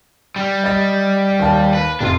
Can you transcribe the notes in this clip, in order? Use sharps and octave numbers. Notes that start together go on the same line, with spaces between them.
G3
D#5 A6
D#2 A5
B4
F1 D4 F4